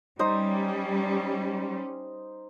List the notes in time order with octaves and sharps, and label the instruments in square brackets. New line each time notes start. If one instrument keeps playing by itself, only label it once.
[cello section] G3 C#4 [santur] D#4 C5 D#6